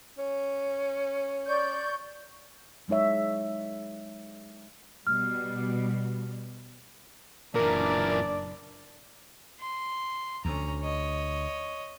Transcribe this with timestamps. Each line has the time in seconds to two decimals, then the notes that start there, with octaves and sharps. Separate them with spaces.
0.19 C#4
1.47 D5 C#6 G6
2.88 F#3 G#3 D#4 C#5 E5
5.07 B2 G3 F6
7.55 F#1 A#2 E3 D4 A#4 D5
9.60 C6
10.45 D2 C#4 A#5
10.82 C#5 D#5